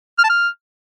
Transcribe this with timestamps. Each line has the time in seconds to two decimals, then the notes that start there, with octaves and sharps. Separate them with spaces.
0.19 F6
0.24 A5
0.30 F6